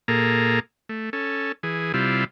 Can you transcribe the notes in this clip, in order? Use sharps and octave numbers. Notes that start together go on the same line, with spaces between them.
A#2 A#3 G#4 A4 A#5
A3
C#4 A4
E3 G#4
C3 G3 E4 F4